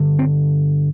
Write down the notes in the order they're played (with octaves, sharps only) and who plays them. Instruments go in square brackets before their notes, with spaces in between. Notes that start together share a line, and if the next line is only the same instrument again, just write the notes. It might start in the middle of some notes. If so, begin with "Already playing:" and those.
Already playing: [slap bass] G2 D3
C4